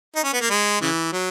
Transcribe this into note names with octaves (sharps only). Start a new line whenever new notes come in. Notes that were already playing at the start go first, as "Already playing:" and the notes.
D#4
C#4
B3
A#3
G#3
C#3 E3
F#3